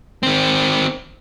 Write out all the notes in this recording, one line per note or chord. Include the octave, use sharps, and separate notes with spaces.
D#3 C4